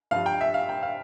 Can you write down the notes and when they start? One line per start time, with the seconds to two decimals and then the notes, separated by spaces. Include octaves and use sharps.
0.11 G2 F3 F5
0.26 G5
0.41 E5
0.54 F5
0.69 G5
0.83 F5